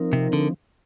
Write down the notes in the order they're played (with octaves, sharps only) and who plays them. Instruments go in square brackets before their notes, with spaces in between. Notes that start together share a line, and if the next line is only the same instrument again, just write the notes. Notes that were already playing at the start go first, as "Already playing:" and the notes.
Already playing: [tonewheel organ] F3 C4 D#4 A#4
[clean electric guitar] C3
D3